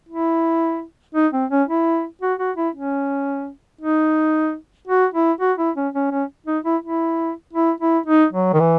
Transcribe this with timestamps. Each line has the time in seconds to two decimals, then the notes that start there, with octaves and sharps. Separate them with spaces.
0.09 E4
1.15 D#4
1.33 C4
1.51 C#4
1.68 E4
2.22 F#4
2.39 F#4
2.57 E4
2.75 C#4
3.81 D#4
4.87 F#4
5.14 E4
5.41 F#4
5.58 E4
5.76 C#4
5.94 C#4
6.11 C#4
6.47 D#4
6.64 E4
6.83 E4
7.53 E4
7.80 E4
8.07 D#4
8.33 F#3
8.54 D#3
8.60 E3